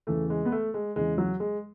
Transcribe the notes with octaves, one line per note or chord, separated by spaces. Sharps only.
E2 C#3 E3 A3
G#3
B3
A3
G#3
E2 C#3 E3 G#3
F#3
G#3